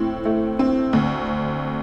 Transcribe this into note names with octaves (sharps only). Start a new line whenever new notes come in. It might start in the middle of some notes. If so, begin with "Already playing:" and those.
Already playing: A2 C4
A3
C4
D2